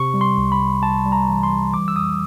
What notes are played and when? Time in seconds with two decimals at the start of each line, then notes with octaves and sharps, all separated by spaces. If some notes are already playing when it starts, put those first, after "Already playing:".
Already playing: C3 C#6
0.14 G3
0.21 C6
0.37 C2
0.52 B5
0.59 C2
0.82 G3 A5
1.05 G3
1.12 A#5
1.28 E3
1.43 C6
1.50 G3
1.73 E3 D6
1.88 E6
1.96 F2 D#6